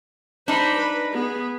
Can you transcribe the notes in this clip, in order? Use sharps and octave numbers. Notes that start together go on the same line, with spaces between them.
D4 D#4 C5 B5
B4
B3 G#4